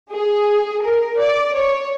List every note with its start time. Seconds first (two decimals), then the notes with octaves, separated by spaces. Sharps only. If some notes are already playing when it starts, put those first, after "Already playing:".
0.11 G#4
0.84 A#4
1.19 D5
1.56 C#5